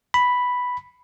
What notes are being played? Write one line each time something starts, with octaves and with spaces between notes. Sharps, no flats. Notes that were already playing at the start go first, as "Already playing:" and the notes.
B5